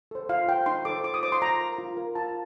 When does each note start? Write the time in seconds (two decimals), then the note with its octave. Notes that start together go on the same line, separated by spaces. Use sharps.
0.11 A4 C5
0.29 F4 F5
0.47 C5 G5
0.66 D#4 C6
0.85 A4 C5 D6
1.04 F4 D6
1.14 D#6
1.23 C5 D6
1.32 C6
1.42 F4 A#5
1.61 A#4
1.79 F4
1.97 A#4
2.15 F4 A5